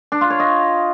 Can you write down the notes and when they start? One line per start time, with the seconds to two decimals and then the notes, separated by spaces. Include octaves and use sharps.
0.12 D4
0.21 F4
0.30 C#5
0.40 D#5